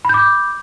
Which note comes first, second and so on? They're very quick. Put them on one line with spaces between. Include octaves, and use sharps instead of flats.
B5 G6 D6